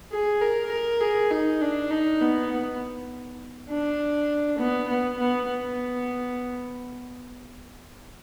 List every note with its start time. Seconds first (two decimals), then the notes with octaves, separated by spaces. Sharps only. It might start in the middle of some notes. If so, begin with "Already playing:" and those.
0.12 G#4
0.42 A#4
0.71 A#4
1.01 G#4
1.31 D#4
1.61 D4
1.91 D#4
2.21 B3
2.50 B3
3.69 D4
4.58 B3
4.88 B3
5.18 B3
5.48 B3